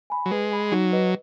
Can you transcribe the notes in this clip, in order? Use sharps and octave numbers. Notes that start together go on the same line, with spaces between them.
G#5 B5
F#3
G#3 B4
G#5 B5
F#3 D#4
B4 D#5